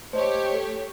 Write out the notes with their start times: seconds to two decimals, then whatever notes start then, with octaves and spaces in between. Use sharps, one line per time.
0.13 A3 G4 C5 C#5 D#5
0.54 A4